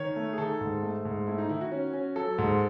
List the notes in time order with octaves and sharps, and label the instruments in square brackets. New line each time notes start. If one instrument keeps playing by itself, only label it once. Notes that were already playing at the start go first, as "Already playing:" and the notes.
Already playing: [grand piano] D#3 C#5
A3
G#4
D#3 A4
G#2
A3
G#2
A3 E4
D#4
D#3 E4
F#4
C#4
C#4
F#3 A4
G#2